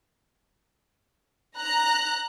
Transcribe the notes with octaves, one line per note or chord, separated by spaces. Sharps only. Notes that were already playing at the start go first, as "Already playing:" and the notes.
A#5 F#6